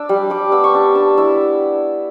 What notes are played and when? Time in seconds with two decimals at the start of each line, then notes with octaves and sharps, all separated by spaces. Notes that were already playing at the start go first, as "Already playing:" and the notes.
Already playing: D4 D6 E6
0.09 G3
0.30 G3 D6
0.52 B3 E6
0.64 C#6
0.74 D4 D6
0.95 D4 E6
1.17 E4 E6